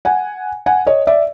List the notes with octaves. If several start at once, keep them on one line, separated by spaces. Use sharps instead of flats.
F#5 G#5
F#5 G#5
C#5 D#5
D5 E5